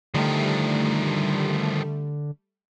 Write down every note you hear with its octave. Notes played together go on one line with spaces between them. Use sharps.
D3 D#3 F3 G3 A3